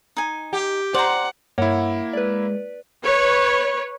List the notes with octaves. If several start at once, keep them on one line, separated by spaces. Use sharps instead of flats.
D#4 G#5
G4
C5 D5 F#5 A#5 C6
G2 A#3 E4 C#5 F#5
G#3 B4 D5
B4 C#5